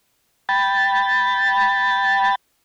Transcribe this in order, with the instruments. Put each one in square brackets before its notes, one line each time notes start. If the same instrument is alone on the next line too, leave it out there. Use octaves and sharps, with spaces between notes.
[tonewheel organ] G5 B5 A6